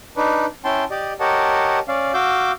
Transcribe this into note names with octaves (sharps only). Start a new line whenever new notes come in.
D4 D#4 B4
C#4 E4 G5 A5 C6
G4 D5 D#5
G4 A#4 C#5 D#5 F#5 A5
C#4 D5 F5
F#4 F5 D6 E6 G6